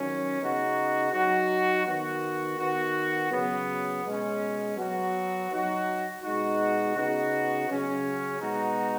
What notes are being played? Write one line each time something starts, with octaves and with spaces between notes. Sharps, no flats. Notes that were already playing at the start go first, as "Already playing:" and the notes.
Already playing: D#3 F#3 C#4
C#3 B3 D#4 F#4
F#3 D#4 F#4
D#3 B3 F#4
D#3 B3 F#4
C#3 F#3 B3
B2 G#3 C#4
F#3 B3 F#4
F#3 D#4 F#4
B2 G#3 D#4 F#4
C#3 B3 D#4 F#4
C#3 F#3 C#4
B2 G#3 B3 D#4 F#4